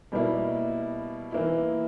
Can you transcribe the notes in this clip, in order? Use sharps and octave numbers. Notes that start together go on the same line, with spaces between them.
B2 G3 A#3 E4
E3 A#3 E4